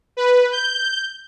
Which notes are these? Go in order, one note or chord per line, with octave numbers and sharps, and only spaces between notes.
B4
G6